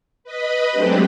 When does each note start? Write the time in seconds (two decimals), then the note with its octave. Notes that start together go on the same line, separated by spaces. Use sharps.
0.24 B4 D#5 B5
0.71 F#3 G#3 A3 C4 D4 G4